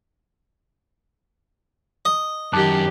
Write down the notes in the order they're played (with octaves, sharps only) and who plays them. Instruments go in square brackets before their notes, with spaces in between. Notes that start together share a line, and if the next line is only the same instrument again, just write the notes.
[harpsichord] D#5
[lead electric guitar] F#2 [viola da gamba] D#3 G4 [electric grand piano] A5 D6 F#6